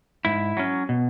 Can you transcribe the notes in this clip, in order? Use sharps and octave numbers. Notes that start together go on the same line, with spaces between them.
G#2 E4
F#3 C#4
B2